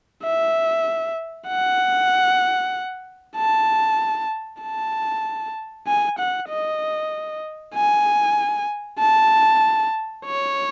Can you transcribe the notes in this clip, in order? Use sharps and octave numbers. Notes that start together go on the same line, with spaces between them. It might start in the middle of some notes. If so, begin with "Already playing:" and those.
E5
F#5
A5
A5
G#5
F#5
D#5
G#5
A5
C#5